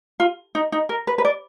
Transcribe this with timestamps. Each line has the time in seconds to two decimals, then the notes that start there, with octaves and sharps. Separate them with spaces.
0.20 F4
0.55 D#4
0.72 D#4
0.89 A#4
1.07 B4
1.18 B4
1.25 D5